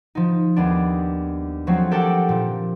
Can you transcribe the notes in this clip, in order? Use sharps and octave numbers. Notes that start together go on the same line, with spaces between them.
F3 D#4
D#2 G#3 B3 D4
F3 F#3 G#3 A3 C4
G4 A4 A#4 F#5 G5 A5
A#2 F3